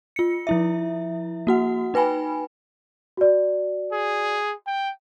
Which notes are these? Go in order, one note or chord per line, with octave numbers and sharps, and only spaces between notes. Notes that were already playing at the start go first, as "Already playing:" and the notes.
F4 C#7
F3 E4 E5
A#3 F#4 F#5
D#4 B4 G5 G#5 B5
F#4 D5
G#4
G5